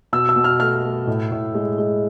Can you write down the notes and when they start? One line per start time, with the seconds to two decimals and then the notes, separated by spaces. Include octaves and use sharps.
0.13 B2 E6
0.29 E6
0.36 B2
0.44 F6
0.60 A3 F6
0.84 A3
1.07 A2
1.31 A2
1.55 G#3
1.78 G#3